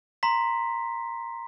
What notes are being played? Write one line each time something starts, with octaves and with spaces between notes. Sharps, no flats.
A#5 C6 B6